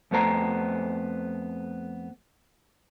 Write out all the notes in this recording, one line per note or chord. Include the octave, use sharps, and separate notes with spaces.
F2 A3 B3 C5 A#5